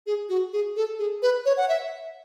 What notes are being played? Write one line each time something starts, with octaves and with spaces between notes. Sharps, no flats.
G#4
F#4
G#4
A4
G#4
B4
C#5
F#5
E5